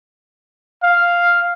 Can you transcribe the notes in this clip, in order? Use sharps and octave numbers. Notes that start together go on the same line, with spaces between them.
F5